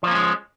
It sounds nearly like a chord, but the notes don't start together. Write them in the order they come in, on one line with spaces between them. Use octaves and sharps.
F3 A#3 C#4 G#3